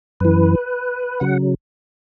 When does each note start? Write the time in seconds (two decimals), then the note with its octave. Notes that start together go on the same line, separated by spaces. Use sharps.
0.20 F#2 E3 B4
1.20 C#3 F#3 F#5